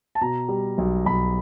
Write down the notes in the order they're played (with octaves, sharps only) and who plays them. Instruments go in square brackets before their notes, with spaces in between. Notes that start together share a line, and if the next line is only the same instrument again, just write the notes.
[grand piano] A5
B2 A#5
G3
B1
B1 B5